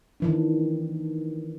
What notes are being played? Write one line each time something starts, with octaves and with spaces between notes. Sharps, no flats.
D#3 E3 D4